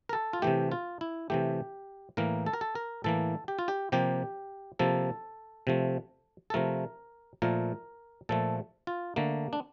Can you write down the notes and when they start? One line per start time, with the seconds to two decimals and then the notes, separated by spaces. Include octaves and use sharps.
0.09 A#4
0.13 A4
0.33 F4
0.42 C3 E3 A3 G4
0.72 F4
1.01 E4
1.30 C3 E3 A3 G4
2.17 A2 E3 A#3 A#4
2.46 A4
2.53 A#4
2.61 A4
2.75 A#4
3.04 A2 E3 A#3 A4
3.48 G4
3.59 F4
3.68 G4
3.92 C3 F3 A#3 G4
4.79 C3 F3 A#3 A4
5.67 C3 F3 A3
6.50 A4
6.54 C3 F3 A3 A#4
7.42 A#2 F3 A3 A#4
8.29 A#2 F3 A3 A4
8.87 F4
9.16 D3 A3 A#3
9.53 D4